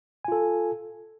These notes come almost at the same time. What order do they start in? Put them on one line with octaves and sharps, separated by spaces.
G#5 F4 A4